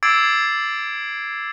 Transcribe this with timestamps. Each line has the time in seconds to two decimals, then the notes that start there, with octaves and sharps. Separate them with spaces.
0.03 D6 E6 G#6 A6 C7 D7